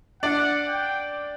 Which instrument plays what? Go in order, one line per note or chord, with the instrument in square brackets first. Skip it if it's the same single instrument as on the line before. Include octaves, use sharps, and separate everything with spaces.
[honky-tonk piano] D4 D5 [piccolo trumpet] F#5
[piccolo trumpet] G5